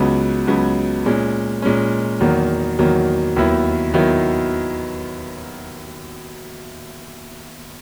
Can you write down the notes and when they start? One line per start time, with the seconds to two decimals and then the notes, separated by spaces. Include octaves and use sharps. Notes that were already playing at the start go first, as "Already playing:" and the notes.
Already playing: C#2 C#3 F#3 B3
0.47 C#2 C#3 F#3 B3
1.06 A#2 G#3 C#4
1.62 A#2 G#3 C#4
2.20 E2 D#3 F#3 A#3
2.79 E2 D#3 F#3 A#3
3.36 D#2 D#3 F#3 B3 E4
3.94 D#3 F#3 B3 E4